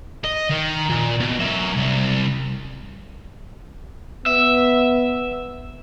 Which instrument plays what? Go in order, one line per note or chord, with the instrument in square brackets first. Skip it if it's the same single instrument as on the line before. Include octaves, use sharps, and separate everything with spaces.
[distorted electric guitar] D#5
D#3
A#2
B2
F#3 E5
C2
[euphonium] B3 [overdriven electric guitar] E5